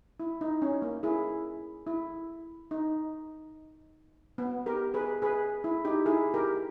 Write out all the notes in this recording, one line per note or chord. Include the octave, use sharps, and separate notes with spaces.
E4
D#4
C#4
A#3
E4 G#4
E4
D#4
B3
G4 A#4
G#4 B4
G#4 B4
E4
D#4 G4
E4 G#4
G4 A#4